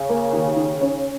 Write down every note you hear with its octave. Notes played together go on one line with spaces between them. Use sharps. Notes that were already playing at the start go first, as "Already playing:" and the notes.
Already playing: C#3
A#3
D#2
D#3
C#4